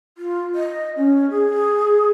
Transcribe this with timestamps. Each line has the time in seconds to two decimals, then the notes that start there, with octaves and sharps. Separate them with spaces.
0.18 F4
0.55 D#5
0.96 C#4
1.30 G#4